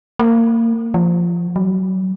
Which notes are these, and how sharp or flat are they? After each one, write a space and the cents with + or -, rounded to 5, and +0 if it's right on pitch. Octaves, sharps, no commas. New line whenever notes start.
A#3 -25
F3 -15
F#3 +25